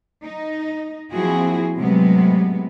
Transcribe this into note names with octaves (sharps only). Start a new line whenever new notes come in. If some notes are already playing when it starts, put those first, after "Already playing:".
D#4
F3 A#3 C4 E4 F#4 G#4
A2 C3 F#3 G#3 B3